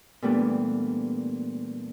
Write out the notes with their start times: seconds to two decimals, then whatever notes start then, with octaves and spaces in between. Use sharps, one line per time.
0.22 A#2 E3 G3 A3 B3 D4